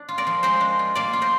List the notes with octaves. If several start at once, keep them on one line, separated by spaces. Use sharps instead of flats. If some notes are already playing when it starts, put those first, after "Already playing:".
Already playing: D4
F4
A#4 D5
F3
G#3 C5 D#5
D4
F4
A#3 D5 F5
F4
C5 D#5